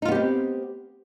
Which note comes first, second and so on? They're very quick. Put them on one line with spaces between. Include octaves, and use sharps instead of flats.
D#4 F4 B3 G4 C4